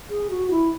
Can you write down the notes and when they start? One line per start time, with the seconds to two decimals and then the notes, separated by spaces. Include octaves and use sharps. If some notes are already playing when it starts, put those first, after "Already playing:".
0.10 G#4
0.30 F#4
0.51 E4